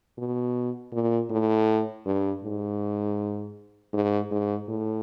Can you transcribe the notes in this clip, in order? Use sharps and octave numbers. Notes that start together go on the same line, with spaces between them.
B2
A#2
A2
G2
G#2
G#2
G#2
A2